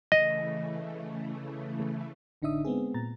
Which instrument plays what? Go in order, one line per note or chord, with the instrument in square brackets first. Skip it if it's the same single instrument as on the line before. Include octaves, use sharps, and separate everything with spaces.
[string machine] C#3 E3 A3 [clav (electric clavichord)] D#5
[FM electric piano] A1 D3 D4 D#4 E5 D#6
G#3 B3 C4 G#4
A#2 A#5 A6